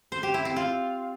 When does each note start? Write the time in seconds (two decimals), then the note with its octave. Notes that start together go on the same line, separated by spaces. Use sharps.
0.12 C5
0.23 G4
0.34 E4
0.45 C4
0.56 F4